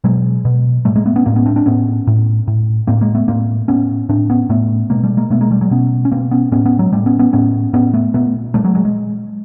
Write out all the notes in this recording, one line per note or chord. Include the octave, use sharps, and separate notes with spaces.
B2 F#3 G#3
B2
A2 G3 A3
G#3 A#3
A3 B3
B3 C#4
A2 A#3 C4
B3 C#4
C4 D4
C4 D4
A2 B3 C#4
A2
A2
A2 A#3 C4
G#3 A#3
A3 B3
A2 A#3 C4
A2 B3 C#4
A2 C4 D4
B3 C#4
A2 A3 B3
B2 G#3 A#3
G3 A3
G#3 A#3
B2 A3 B3
G#3 A#3
G3 A3
F#3 G#3
B2 B3 C#4
C#4
B2 A#3 C4
B3 C#4
A2 B3 C#4
B3 C#4
F#3 G#3
A2 G3 A3
B3 C#4
B3 C#4
A2 B3 C#4
A2 B3 C#4
A3 B3
A#2 A3 B3
A#2 G3 A3
F#3 G#3
F#3 G#3
G#3